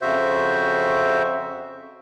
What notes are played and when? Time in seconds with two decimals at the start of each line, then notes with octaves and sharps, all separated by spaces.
0.02 F2 C#3 F#4 C5 E5